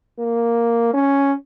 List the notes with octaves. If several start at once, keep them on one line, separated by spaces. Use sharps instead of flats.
A#3
C#4